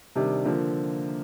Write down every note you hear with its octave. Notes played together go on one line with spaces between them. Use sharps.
C3 D#3 G3 D4
D3 F3 A#3